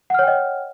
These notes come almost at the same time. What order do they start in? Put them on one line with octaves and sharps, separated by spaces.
F#5 F6 C#5 G5 D#5